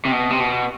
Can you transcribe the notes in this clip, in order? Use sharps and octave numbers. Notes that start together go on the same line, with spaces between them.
C3
B2
C3
B2